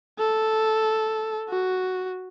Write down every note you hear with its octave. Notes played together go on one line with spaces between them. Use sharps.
A4
F#4